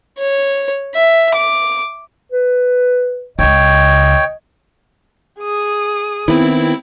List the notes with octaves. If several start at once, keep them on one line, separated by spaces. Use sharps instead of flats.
C#5
E5
D6
B4
C#2 C#3 C#5 D#5 G5
G#4 D#6
D#3 B3 C4 E4